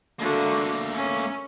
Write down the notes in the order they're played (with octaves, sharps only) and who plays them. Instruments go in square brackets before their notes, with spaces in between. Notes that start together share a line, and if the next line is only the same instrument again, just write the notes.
[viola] D3 F#4 [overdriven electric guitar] A3 A#3
[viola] C#4